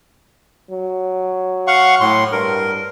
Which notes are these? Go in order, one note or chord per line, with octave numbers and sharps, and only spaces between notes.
F#3
F5 F#5 C#6
A2 C6
G2 A#4